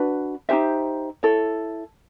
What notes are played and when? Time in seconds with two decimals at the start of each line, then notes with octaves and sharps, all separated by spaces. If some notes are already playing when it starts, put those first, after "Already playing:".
Already playing: D4 F#4 B4
0.49 D#4 G4 C5 E5
1.23 E4 A4 C#5